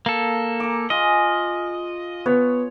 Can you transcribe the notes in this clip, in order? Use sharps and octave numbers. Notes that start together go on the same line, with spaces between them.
A#3 A4
A#5 D6
F4 G#4 D#5
B3 C#5